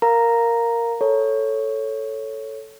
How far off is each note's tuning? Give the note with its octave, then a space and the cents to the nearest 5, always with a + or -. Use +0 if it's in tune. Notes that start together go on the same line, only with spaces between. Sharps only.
A#4 +0 F5 +5 A#5 +0
A4 +0 C#5 +0